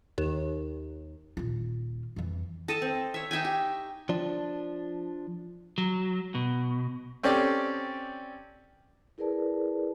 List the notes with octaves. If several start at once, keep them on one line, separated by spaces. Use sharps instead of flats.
D#2
D#1 F4
F2 E3
A4 D#5 A5
C4
C#5 E5
D#4 E5 G5 G#5
G4
F3 D4
F#3
B2
C4 C#4 G4 A4 D5
E4 G#4 A#4 B4 D5 A5